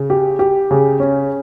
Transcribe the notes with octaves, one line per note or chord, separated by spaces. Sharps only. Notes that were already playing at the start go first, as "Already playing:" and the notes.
Already playing: C#3
G4
G4
C#3
C#4